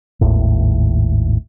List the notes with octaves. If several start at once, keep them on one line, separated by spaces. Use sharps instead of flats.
G#1 D#2 A2